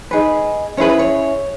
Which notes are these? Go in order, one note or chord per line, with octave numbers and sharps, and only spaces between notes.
D#4 G#4 B4
C#4 E4 G#4 B4 C#5
B4
C#5